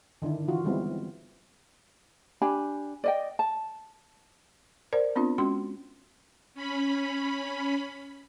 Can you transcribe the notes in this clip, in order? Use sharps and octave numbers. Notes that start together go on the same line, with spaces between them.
D3 D#3 D4 E4
E3 F4 F#4
G3 G#3 B3 C4 D#4 E4
D4 G4 G#5 B5
D5 D#5 G5
A5
A#4 C5 D5
B3 C4 D4 F4
G#3 C#4 F#4 C6
C#4 B5